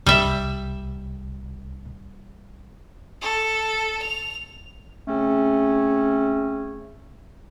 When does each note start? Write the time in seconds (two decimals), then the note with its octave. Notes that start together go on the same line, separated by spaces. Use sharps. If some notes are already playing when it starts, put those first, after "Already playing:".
0.06 C2 G3 E5
3.22 A4
4.02 F7
5.07 C#3 A3 C4 C#4